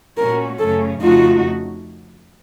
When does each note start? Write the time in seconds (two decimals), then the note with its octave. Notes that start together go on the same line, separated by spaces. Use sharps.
0.17 A#2 A3 C#4 F#4 A#4
0.59 F#2 C#3 A3 C#4 A4
1.00 F2 C#3 A3 D#4 F4 F#4